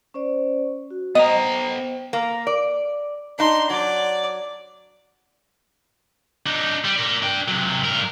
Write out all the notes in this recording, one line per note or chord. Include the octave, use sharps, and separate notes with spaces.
C#4 C5 D5
F#4
B3 C5 D#5 G5 A#5
A#3
D5
D4 D#4 C6
F#3 D5
D4 D#4
G3
A#4 D5
D4 G5
C3 F#3
G2 A#4